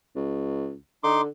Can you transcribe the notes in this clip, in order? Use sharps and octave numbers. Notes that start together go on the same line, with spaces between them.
C#2
D3 D#4 C6 D6